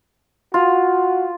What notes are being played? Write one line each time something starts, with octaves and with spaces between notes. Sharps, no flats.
F4 F#4